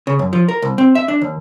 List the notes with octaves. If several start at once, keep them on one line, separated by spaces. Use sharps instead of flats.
C#3
F#2
F3
A#4
C2
C4
E5
D4
D#2